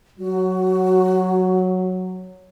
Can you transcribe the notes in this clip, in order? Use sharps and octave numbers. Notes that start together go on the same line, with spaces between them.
F#3 F#4